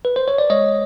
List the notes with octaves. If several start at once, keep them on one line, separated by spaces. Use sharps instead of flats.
B4
C5
C#5
D5
G#3 C#5 D#5